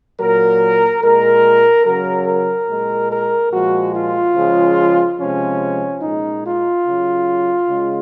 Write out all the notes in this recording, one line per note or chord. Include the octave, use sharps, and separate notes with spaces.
A#2 F#3 A#4
A#2 G#3 A#4
C#3 F#3 A#4
A#4
A#2 G#3
A#4
A#2 F3 G#3 F#4
F4
C#3 F3 G#3
C3 F3 G#3 C#4
A#2 G#3 D#4
F4
C#3 F#3
C#3 G#3